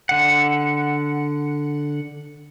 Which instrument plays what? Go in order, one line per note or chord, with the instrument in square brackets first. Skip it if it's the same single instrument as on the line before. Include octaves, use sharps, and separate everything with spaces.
[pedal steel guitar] D3 F#5